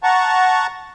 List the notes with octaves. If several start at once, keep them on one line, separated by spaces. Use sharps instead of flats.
F#5 A5 A#5 C#6